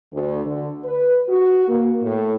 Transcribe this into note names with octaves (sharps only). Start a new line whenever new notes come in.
D2
D3
B4
F#4
A#3
A2